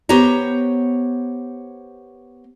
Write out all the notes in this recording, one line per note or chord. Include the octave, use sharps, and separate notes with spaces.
B3 G4 C5 C#5 A#5